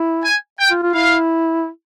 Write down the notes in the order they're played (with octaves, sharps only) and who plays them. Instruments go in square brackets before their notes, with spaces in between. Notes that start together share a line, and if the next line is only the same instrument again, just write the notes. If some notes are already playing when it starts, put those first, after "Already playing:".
Already playing: [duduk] E4
[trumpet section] G#5
G5
[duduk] F4
F4
[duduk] E4 [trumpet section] F5